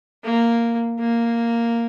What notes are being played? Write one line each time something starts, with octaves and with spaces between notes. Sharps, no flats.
A#3
A#3